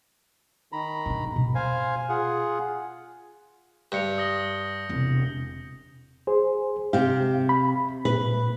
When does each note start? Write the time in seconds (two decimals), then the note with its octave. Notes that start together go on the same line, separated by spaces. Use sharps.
0.72 D#3 A#5 B5
1.06 E1 D4
1.36 B2
1.55 C5 F5 G#5
2.09 F4 G#4 F#5
3.92 G2 G6 C#7 F7
4.18 D#6 A#6 G7
4.89 E1 C3
6.27 G#4 C5
6.93 C3 G4 F5
7.49 B5
8.05 A#2 B4